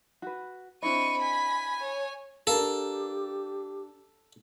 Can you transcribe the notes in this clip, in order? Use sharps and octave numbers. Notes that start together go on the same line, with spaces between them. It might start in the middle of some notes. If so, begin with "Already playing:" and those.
F#4 B4
C4 D4 E4 D#5 B5 C#6 D#7
G#5 B6
C#5
D4 G4 A4 A#4 F5